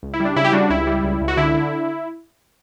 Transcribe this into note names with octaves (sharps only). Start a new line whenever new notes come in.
C#2
E4
G3
D4
C#3 E4
G4
G3 D4 F#4
C#2 E4
G3
C#2
C#2
F#4
D3 E4
D3